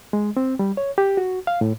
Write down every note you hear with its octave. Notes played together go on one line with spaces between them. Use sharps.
G#3
C4
G3
C#5
G4
F#4
F5
A2